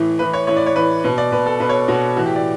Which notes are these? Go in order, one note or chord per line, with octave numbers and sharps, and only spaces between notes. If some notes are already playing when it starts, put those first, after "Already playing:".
Already playing: A2 E3
A2 E3 B4
C#5
A2 E3 C#5
D5
C#5
A2 E3 B4
B2 B4
D5
B2 B4
A4
B2 B4
C#5
B2 F#4
A2 E3 F#4
G4
D5